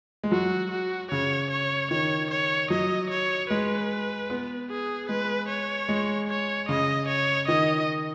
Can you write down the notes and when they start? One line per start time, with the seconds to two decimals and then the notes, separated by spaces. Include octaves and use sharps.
0.24 G#3
0.32 F#3 F#4
0.71 F#4
1.11 C#3 C#5
1.51 C#5
1.91 D#3 C#5
2.31 C#5
2.70 F#3 D#5
3.10 C#5
3.50 G#3 B4
4.30 B3
4.70 G#4
5.09 G#3 B4
5.49 C#5
5.89 G#3
6.29 C#5
6.69 C#3 D#5
7.08 C#5
7.48 D#3 D#5